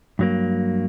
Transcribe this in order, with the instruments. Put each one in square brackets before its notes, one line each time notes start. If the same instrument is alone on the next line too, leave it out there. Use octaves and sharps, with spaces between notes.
[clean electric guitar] G2 F#3 A#3